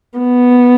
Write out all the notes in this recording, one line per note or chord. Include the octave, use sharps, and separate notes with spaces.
B3